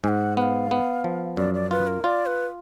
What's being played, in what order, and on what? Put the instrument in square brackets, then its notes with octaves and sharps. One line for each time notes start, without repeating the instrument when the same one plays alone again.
[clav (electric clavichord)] G#2 [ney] G#5
[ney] F#5
[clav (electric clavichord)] B3 [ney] F#5
[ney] F5
[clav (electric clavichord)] B3
F3
[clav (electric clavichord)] F#2 [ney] D5
[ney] D5
[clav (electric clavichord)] F4 [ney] B4
[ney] A#4
[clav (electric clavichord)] F4 [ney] D5
[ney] B4